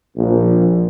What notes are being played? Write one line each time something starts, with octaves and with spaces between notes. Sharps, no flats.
A#1